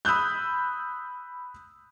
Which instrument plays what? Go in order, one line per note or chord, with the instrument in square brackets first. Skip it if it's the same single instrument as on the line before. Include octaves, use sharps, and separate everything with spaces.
[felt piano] B5 D#6 E6 F#6 G6